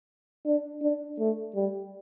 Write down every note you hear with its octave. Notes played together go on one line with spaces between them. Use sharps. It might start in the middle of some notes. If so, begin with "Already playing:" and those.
D4
D4
A3
G3